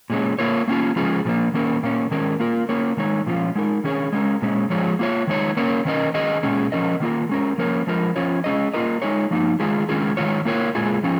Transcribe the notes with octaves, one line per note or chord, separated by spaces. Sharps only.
A#2 G#3 C#4
A#3 F4 A#4 C#5
A#3 C#4 F4
F3 G#3 C#4 F4 G#4
A#2 F3 A#3
D#3 A#3 C#4 A#4
A#2 A#3 C#4
D#3 G#3 C#4 A#4
A#3 F4 A#4
A#3 C#4 A#4 C#5
D#3 G#3 D#4 C#5
A#2 F3 C#4 F4
G#3 D#4 A#4
D#3 C#4 G#4 C#5
G#3 C#4 A#4
A#2 G#3 C#4
F3 G#3 F4 G#4 C#5
A#3 F4 C#5
D#3 G#3 D#4 C#5
A#3 C#4 A#4 C#5
D#3 C#4 A#4 D#5
D#3 C#4 G#4 D#5
A#2 G#3 C#4 G#4
F3 C#4 A#4 D#5
D#3 A#3 F4 A#4
G#3 C#4 A#4
F3 A#3 C#4 A#4 C#5
F3 G#3 F4 A#4
F3 C#4 F4 C#5
G#3 C#4 G#4 D#5
A#3 F4 A#4 D#5
G#3 D#4 G#4 C#5
F3 A#3 D#4
D#3 G#3 F4 G#4
D#3 G#3 C#4 F4 G#4
D#3 G#3 F4 C#5
A#3 F4 A#4 C#5
A#2 G#3 F4 G#4
F3 C#4 F4